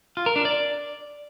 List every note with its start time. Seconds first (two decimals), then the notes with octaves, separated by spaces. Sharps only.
0.17 F4
0.26 A#4
0.36 D4
0.45 D5